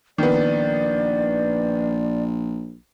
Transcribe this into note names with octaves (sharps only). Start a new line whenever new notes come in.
A#1 D#3 B3 D5